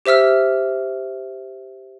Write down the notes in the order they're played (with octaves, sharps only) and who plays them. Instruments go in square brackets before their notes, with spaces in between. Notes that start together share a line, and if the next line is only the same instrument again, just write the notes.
[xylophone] G4 C5 E5 E6 F6